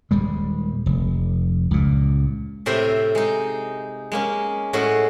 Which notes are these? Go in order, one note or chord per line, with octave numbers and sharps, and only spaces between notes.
D#1 G3 G#3
F1
C#2 A#2
A2 C3 A#4 C5 E5
G#3 D#4
G#3 A#3 C#4
A2 G#3 C#4 F#4